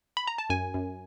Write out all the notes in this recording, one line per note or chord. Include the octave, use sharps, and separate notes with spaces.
B5
A#5
A5
F#2 G#5
F#2